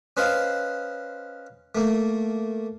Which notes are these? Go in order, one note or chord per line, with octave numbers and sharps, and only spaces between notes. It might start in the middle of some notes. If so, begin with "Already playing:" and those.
C#4 B4 C5 D#5 F5 C6
A3 A#3